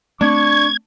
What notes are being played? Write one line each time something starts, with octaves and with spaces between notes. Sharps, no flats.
A3 C4 D4 C#6 G#6